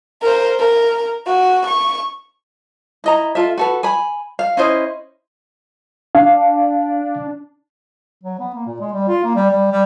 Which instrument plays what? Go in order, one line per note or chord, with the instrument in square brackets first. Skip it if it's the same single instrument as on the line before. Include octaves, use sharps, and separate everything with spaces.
[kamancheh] A#4 C5
A#4
F#4
C#6
[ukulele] E4 D#5 A#5
F4 A4 E5
F#4 A4 B4
G#5 B5
F5
C#4 E4 C5 D#5
[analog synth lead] D4 [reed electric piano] F5
[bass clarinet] F#3
B3
A#3
A#2
G#3
G3
F4
A#3
G3
G3
G3